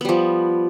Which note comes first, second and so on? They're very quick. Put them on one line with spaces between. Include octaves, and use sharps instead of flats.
B3 G3 F3